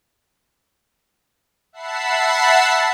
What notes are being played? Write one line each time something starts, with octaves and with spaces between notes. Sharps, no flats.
E5 F#5 A5 B5 C7